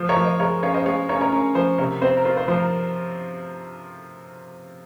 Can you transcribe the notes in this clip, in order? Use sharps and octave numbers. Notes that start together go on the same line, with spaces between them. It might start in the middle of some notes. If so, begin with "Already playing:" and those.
Already playing: F3 C5
A#4 C#5
F3
C5 D#5
G#3 A#4 C#5
C#4 C#5 F5
C5 D#5
G#3 C#5 F5
C#4 A#4 C#5
A#4 C#5
C#4 A#4
F3 C5
C3 A#4 C#5
C4 C5
A#4
F4 C5
C5
F3 C5
A#4